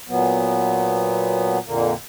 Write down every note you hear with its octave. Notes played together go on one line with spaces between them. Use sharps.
A#2 F#3 B3
F2 A#2 D3 A#3